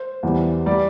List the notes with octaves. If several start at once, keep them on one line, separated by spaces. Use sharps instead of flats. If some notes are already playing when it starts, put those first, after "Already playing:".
Already playing: C5
E2 E3 G3
G3 D5